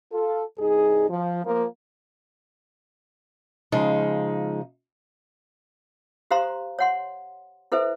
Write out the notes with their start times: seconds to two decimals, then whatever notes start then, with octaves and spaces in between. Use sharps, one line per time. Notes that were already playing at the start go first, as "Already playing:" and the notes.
0.12 F4 A4
0.58 C2 G2 D#4 G#4
1.10 F3
1.45 F3 A#3
3.72 C#3 F3 G#3 D#4
6.31 G4 C5 F5 A#5 C6
6.79 C#5 F#5 C6
7.72 E4 A4 B4 C5 E5